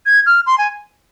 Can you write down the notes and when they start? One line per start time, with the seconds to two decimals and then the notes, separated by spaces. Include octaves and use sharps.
0.06 G#6
0.26 F6
0.46 C6
0.58 G#5